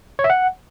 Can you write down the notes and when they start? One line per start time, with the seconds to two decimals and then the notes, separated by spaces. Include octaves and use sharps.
0.19 C#5
0.24 E5
0.30 F#5